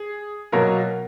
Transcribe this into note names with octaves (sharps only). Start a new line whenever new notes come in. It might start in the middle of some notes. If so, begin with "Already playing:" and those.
Already playing: G#4
B2 F#3 A#3 A#4